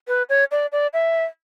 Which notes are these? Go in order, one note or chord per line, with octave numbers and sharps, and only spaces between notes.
B4
C#5
D5
D5
E5